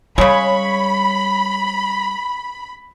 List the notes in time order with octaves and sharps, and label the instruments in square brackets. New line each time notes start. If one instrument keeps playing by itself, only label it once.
[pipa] C#3 G#3 [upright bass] G3 [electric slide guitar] C#5 [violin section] B5